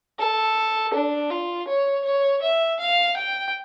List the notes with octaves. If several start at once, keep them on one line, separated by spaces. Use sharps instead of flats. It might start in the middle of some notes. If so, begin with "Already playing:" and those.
A4
D4
F4
C#5
C#5
E5
F5
G5